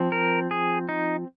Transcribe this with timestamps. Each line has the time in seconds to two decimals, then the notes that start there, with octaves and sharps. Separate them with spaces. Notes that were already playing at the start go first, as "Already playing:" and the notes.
Already playing: F3 C4
0.12 A#4
0.51 G#4
0.89 D#4